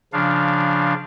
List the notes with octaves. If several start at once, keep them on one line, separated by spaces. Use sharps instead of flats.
C#3 F3 D4 F5